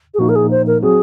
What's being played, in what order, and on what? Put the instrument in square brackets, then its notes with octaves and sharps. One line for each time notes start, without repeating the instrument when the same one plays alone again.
[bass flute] G#4
[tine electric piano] A#2 F3 A#3 D#4 [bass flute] F#4
[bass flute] A#4
G#4
C5
A#4
[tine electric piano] F#3 C4 F#4 [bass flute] G#4